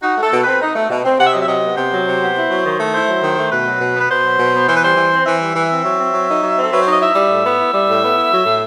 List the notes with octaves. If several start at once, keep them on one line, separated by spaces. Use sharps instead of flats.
D#4 F#4
A3 A4
B2
C4 B4
D#4
A3
B2
C4
C3 F#5
E5
F#3 D#5
E5
C3 D#5
B3
C3 C5
F#3
C3
B3
E4
F#3
D#3
A3
E4 C5
F#3
D#3
A3
B2 B4
F#3
B2
B3 B4
B2 C5
F#3
B2
B3
E3 C5
B4
G3 C5
E3
C4
E3 E5
G3
E3
C4
F#3
C4
F#3
D#4
F#3
C4 A4
F#3 B4
C5
D#4 D#5
E4 E5
G3
A2
B3
E4
G3
A2
B3
E4
F#3
A2